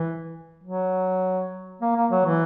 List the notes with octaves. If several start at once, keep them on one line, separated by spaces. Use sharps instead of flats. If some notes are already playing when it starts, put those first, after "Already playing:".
Already playing: E3
F#3
A#3
A#3
F#3
E3